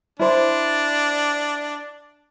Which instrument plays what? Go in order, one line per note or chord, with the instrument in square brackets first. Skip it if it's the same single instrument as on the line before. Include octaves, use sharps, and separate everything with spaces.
[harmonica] D4 [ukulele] E4 C5